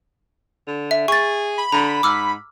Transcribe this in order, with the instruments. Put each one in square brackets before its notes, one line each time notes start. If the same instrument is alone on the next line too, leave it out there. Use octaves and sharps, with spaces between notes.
[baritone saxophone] D3
[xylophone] E5
[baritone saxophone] G#4 [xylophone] C#6 A6
[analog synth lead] B5
[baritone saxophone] D3 [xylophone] A#5
[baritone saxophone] G#2 [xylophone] D6 E6 F6